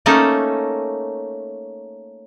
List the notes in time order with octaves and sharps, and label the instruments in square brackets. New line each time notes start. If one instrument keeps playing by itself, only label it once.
[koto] A3 A#3 C#4 D#4 A4